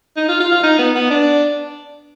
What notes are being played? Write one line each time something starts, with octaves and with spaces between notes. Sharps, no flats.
D#4
F4
F4
F4
D#4
B3
B3
D4